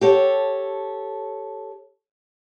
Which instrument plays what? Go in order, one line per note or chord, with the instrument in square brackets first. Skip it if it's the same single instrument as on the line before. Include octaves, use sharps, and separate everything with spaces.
[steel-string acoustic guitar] G4 A4 C#5